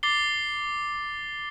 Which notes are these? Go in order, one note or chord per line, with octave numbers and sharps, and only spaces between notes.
D6 A6 C7 G7